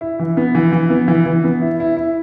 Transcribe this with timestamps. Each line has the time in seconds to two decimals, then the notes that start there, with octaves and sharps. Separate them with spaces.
0.01 E4
0.19 E3
0.37 B3
0.55 E3
0.73 E3
0.90 B3
1.08 E3
1.26 E3
1.44 B3
1.62 E4
1.80 E4
1.97 E4